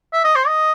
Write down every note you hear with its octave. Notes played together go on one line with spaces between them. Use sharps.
E5
D#5
C5
D#5